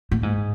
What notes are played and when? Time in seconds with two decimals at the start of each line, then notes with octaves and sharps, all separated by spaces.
0.11 A2
0.23 G#2